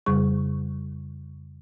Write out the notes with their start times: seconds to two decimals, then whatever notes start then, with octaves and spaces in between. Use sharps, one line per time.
0.06 F2 C#3 G3 G#4 C#6